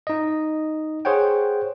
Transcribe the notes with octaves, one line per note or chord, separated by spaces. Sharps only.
D#4 D#5
G#4 C5 C#5 F#5 G5